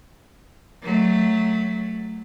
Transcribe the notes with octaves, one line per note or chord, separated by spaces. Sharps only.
F#3 A3